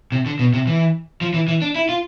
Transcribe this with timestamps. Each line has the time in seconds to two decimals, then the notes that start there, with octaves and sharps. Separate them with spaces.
0.12 C3
0.26 D3
0.39 B2
0.54 C3
0.67 E3
1.21 F3
1.34 E3
1.48 E3
1.62 D4
1.76 E4
1.89 F4